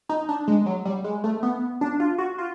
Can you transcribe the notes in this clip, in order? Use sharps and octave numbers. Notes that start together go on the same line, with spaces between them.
D#4
D4
G#3
F#3
G3
G#3
A3
B3
D4
F4
F#4
F4